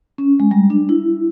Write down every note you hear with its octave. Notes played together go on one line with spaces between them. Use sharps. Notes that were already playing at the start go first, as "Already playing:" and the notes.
C#4
G#3
G3
D4
E4